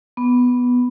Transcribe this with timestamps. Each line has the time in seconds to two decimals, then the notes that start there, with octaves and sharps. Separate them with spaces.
0.17 B3